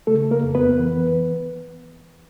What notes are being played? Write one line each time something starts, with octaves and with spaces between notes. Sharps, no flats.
C#3 A3 A4
A#3 A#4
F2
B3 B4
E3